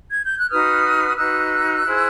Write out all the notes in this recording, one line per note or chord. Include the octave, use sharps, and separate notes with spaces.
G#6
G6
F#6
D#4 F#4 B4 D#6 F6
D#4 F#4 B4 E6 F#6
E4 G#4 C5